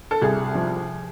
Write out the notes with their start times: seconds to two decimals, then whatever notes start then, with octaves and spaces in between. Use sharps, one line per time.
0.11 A4
0.21 C2 G#4
0.55 F3